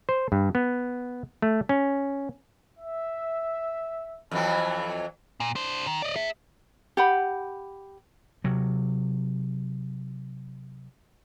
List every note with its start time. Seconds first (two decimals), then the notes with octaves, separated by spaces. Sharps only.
0.09 C5
0.32 G2
0.55 B3
1.42 A3
1.69 C#4
2.79 E5
4.31 F2 E3 F#3 G#5 A5 B5
5.40 A#2
5.56 D4 C5
5.87 D#3
6.02 D5 D#5
6.16 G#4 E5
6.97 G4 F#5 B5
8.44 C3 F#3